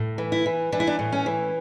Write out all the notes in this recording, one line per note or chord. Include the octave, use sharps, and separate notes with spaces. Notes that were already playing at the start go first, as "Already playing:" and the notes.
Already playing: A2
E3
E4
E3
E3 D4
E4
D4
A2
C#4
E3